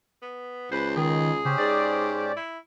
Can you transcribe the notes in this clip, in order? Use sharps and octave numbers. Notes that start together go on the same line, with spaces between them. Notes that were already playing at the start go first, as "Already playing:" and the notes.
B3
C#2 B4 C5
D#3 G#4
C#3 C#4 G4 C5
G#2 D5
E4